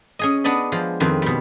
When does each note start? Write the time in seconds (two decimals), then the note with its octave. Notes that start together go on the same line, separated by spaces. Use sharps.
0.19 C#4 G#4 D#5
0.44 B3 D4 D5 D#5 B5
0.72 F3 G#3
1.00 F2 D#3 C4 B4
1.22 B2 G3